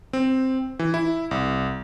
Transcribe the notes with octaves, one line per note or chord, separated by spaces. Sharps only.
C4
E3
E4
C2